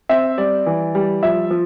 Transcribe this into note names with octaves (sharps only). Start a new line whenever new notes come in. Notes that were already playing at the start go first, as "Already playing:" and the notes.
C4 E5
G3 D5
E3
G3
F3 E5
F3